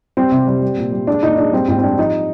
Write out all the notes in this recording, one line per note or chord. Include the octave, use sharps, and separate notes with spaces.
G3 C4
C3
G3
G3
A#2
G3
G#3 D4
A#2 D#4
G#3 D4
G3 C4
G#2 C4
C4
G3 D4
F3 D#4